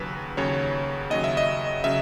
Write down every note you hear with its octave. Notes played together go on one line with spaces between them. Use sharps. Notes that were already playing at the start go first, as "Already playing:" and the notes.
Already playing: D#2 C#3 F#3 B4
D#2 C#3 F#3 C#5
D#2 C#3 F#3 D#5
E5
D#5
C#3 F#3 E5